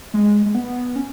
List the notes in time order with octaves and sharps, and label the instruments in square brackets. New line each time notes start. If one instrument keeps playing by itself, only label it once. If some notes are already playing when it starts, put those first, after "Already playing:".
[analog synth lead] G#3
G#3
B3
C#4